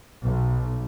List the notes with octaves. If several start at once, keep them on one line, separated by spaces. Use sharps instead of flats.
B1